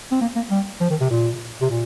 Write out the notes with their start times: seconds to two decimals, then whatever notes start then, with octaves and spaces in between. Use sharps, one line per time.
0.11 C4
0.21 A#3
0.36 A#3
0.51 G3
0.81 F3
0.90 D#3
1.01 C3
1.10 A#2
1.61 C3
1.70 A#2